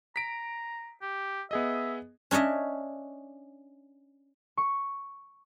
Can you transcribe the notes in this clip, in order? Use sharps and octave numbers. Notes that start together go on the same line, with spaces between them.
A#5 B6 D7
G4
B3 G#4 D#5 E5
C#4 D4 C#5 D#5 E5
C#6